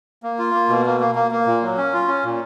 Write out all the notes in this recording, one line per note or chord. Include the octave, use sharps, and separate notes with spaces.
A#3
F4
A#3
B2
A#3
A#3
A#3
A#3
A#2
F#3
C#4
F4
C#4
A#2